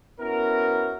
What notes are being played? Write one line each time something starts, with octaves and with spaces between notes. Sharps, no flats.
B3 C#4 E4 F#4 A#4